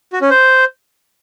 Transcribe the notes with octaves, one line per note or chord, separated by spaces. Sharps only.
F#4
C#4
C5